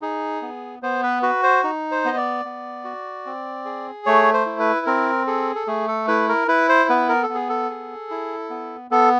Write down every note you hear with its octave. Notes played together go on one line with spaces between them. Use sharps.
D#4 G#4
B3
B3 C5
B4
F#4 B4
C5
D#4
C5
B3 D#5
D5
B3
F#4
C4
G#4
A3 C#5
C5
E4
B4
C4 A#4
G#4 A4
A4
A3 G#4
A4
E4 B4
A#4
E4 B4
C5
B3 B4
A#4
A4
B3
G#4
A4
G#4
E4
B3
B3 A4